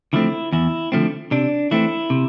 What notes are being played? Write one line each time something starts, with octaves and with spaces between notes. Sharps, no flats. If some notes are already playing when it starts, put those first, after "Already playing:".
D3 F3 A3 C4 E4
E2 E4
D3 F3 A3 C4
C3 D4
E3 A3 C4 E4
C3